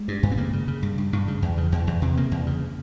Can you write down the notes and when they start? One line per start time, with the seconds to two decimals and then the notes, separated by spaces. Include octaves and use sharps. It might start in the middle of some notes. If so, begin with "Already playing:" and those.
Already playing: G#3
0.08 G2
0.23 G2
0.32 C4
0.38 C#3 A#3
0.53 C#3
0.68 C#3
0.83 G2
0.98 G2
1.13 G2
1.28 C#3
1.42 E2
1.58 C#3
1.72 E2
1.87 E2
2.02 C3
2.17 C#3 A#3
2.31 E2
2.47 C#3